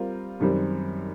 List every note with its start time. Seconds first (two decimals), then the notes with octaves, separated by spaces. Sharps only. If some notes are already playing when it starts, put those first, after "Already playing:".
Already playing: G3 C4 F4 A#4
0.40 F#2 D#3 G3 C4